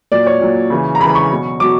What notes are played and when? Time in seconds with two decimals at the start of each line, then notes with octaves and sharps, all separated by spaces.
0.12 A#2 F#3 D5
0.27 C#5
0.41 A#2 F#3
0.70 C#3 E3
0.95 A#5
1.00 C#3 B5
1.05 E3
1.10 B5
1.15 C#6
1.31 B2 F#3
1.60 B2 F#3 D6